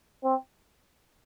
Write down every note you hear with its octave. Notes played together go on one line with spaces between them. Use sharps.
C4